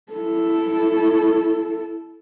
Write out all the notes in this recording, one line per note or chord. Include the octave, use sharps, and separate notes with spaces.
E4 A4